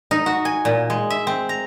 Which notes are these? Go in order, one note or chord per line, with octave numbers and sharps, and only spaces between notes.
D#4
F#4
G#5
A#2
G#3
E5
C4
A#5